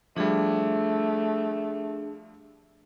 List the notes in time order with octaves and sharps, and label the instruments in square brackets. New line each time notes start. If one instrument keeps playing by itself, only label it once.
[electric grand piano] F3 G3 [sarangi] A3 [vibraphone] D4 G#4